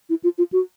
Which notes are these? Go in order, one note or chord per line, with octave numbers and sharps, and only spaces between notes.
E4
F4
F4
F#4